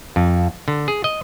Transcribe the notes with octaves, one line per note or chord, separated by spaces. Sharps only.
F2
D3
G#4
D#5